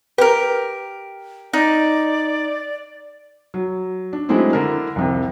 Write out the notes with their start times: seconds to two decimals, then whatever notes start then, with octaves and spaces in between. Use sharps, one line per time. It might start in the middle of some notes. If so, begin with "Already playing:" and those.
0.18 G4 A#4 B4
1.53 D#4 D5
3.54 F#3
4.13 D4
4.29 F#3 G#3 A3 C4 D4 E4
4.53 D3 D4 E4 A#4
4.96 C2 F2 C3